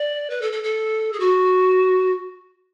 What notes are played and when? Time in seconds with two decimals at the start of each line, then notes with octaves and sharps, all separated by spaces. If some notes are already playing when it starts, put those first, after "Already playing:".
Already playing: D5
0.30 B4
0.41 A4
0.52 A4
0.63 A4
1.12 G#4
1.19 F#4